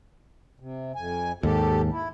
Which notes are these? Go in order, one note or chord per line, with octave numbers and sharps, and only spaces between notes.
C3
F2 G#5
D#2 G#2 G4 A4
E4